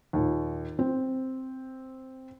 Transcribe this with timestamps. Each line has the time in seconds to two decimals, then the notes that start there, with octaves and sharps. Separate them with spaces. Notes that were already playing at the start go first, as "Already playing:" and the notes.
0.13 D#2 A#2
0.79 C4